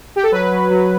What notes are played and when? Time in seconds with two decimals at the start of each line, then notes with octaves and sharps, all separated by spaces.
0.16 G4
0.23 A4
0.32 F#3 B4
0.51 F#3
0.70 F#3